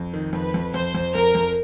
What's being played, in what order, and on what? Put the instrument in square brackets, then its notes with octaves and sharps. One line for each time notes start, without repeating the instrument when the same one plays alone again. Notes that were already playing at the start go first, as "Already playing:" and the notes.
Already playing: [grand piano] F2
D#3
[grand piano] F2 [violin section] B4
[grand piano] F2
[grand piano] F2 [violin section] C5
[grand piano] F2
[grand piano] F2 [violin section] A#4
[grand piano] F2